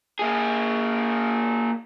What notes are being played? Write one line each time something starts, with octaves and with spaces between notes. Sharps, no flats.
A#3 G#4